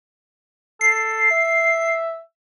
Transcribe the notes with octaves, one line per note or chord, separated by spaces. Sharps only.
A4 C7
E5